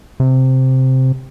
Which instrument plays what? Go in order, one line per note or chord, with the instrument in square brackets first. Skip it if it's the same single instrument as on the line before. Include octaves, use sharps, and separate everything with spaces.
[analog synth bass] C3